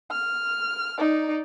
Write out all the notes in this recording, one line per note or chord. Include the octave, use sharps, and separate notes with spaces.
F6
D#4 D5